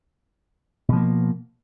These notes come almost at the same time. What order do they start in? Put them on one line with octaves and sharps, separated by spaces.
B2 F3 A#3